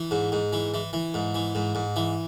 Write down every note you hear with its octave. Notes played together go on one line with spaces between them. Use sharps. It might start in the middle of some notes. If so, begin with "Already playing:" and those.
Already playing: E3
G#2
G#2
E3
E3
E3
G#2
E3
G#2
G#2
E3